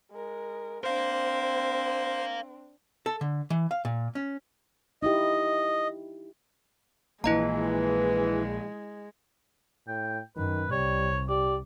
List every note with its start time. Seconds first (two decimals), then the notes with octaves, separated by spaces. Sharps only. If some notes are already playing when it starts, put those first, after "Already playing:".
0.11 G#3 A#4
0.84 C4 D4 A#4 C5 F5
3.06 A4
3.21 D3
3.50 E3
3.71 F5
3.85 A#2
4.15 C#4
5.03 D#4 E4 G4 D#5
7.24 A#1 E3 G#3 A#3 E4 D#5 A#5
9.88 A2 G5
10.37 F#2 D#3 B4
10.71 C2 C3 G3 C#5
11.29 G4 D5